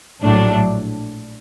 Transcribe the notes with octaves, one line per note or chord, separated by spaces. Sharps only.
A#1 A2 F#3 A3 D4